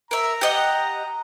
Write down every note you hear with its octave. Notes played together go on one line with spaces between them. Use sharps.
A#4 E5 A#5
G4 D#5 F#5